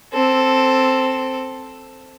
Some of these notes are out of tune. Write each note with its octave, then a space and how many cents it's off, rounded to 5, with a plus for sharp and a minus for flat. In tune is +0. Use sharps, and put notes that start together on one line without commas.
C4 +0 A4 +0